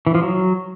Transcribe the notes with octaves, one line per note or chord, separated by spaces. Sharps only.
E3
F3
F#3